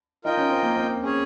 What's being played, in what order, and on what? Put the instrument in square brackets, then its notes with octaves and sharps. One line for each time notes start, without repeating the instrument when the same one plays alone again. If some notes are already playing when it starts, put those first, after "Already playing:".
[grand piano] D#4 [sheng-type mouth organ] F4 A#4 D#5 G5
[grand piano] C#4
C4
A#3
C4
[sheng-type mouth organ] C#4 G#4 C#5